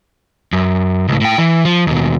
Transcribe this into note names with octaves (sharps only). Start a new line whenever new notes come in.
F#2
C#2 A2
A2 G5
E3
F3
D#2 B2